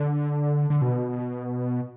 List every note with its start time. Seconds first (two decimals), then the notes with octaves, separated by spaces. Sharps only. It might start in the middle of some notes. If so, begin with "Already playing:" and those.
Already playing: D3
0.70 D3
0.82 B2